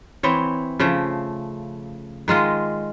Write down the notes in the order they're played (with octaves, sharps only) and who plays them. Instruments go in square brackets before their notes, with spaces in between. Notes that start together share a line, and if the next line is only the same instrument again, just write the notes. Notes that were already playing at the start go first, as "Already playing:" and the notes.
[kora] E3 C4 C#5
C#3 F3 A3
D#3 G#3 F4 D#5